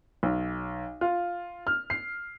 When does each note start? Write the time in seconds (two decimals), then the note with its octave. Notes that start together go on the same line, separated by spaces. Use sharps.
0.23 B1
1.01 F4
1.67 F6
1.90 C7